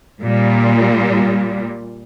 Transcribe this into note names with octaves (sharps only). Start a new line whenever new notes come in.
A#2 G3